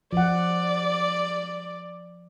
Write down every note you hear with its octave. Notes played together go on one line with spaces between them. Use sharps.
F3 D5 F#5